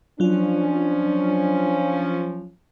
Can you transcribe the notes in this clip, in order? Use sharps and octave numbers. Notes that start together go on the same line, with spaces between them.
F3 F#3 C#4 D4 F4